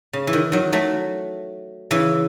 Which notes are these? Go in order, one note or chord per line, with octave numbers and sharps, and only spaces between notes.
C#3
E3
D#3
D#3 F#3
F#3 A3
C#3 E3